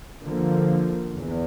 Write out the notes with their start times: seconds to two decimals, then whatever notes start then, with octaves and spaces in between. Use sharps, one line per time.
0.24 D3 F3 A#3
1.17 E2